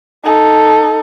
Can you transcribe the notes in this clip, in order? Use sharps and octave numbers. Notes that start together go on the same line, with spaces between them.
D#4 A4